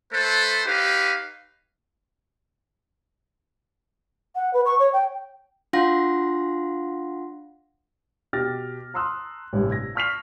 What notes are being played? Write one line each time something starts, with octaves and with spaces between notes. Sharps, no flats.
A3 A4 B4 C5
D#4 G4 B4 C#5 F5
F#5
B4
C#6
C#5
G5
D4 F4 F5 F#5 C6 A#6
B2 G4 F6 A6 A#6
A5 A#5 C6 D#6 E6 F#6
A1 G2 C3 G3
G#6 A#6
A5 C#6 F6 B6 C7 F7